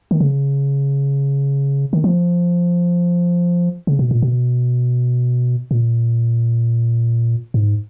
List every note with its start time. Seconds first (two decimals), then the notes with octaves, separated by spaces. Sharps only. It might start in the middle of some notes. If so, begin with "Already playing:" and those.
0.11 D#3
0.20 C#3
1.93 D#3
2.04 F3
3.87 C#3
3.99 B2
4.11 A#2
4.22 B2
5.71 A#2
7.54 G#2